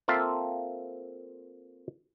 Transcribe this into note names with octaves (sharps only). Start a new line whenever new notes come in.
A#3 C4 F4 A4 E5 F5